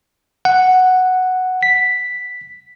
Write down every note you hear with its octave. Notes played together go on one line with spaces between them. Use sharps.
F#5
B6